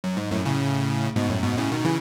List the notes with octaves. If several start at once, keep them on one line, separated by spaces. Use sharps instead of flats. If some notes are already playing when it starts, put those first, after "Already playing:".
F#2
G#2
F#2 A2
A2 C#3
G#2 B2
F#2 A2
G#2 B2
A2 C#3
B2 D#3
C#3 E3